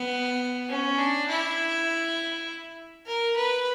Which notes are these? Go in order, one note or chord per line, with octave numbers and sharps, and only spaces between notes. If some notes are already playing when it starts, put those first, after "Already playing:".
Already playing: B3
C#4
D4
E4
A#4
B4